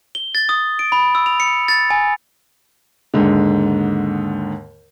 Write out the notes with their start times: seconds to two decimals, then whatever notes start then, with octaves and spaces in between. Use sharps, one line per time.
0.15 G7
0.35 A6
0.49 D#6
0.79 D7
0.92 B5
1.15 E6
1.26 F7
1.40 C#7
1.68 A6
1.90 G#5
3.14 D#2 G#2 D3